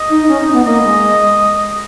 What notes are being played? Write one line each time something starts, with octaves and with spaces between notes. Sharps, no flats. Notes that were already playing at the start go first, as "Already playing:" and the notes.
Already playing: D#5
D#4
C#4
D#4
B3
A#3 D#5
G#3